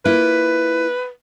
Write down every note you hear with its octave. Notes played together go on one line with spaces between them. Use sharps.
A#3 E4 F4 B4